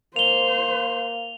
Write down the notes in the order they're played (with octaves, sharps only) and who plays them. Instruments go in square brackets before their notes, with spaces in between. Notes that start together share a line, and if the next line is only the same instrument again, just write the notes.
[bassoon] A#3 [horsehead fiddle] C5 [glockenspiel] F7 G7